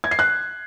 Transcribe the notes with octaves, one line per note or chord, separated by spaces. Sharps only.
G#6
C7
F#6